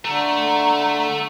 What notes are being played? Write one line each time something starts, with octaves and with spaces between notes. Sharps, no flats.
D3 A3 A#5